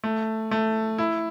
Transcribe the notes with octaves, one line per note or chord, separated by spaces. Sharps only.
A3
A3
E4